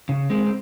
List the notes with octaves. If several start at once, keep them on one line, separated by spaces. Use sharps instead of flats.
C#3
G#3 C4
C4